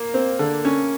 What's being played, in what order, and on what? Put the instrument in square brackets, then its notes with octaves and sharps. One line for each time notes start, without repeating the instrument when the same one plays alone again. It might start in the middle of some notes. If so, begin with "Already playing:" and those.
Already playing: [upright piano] A#3
[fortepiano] C4
D3
C#4